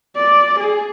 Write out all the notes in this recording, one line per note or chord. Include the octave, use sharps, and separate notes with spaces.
D5
G#4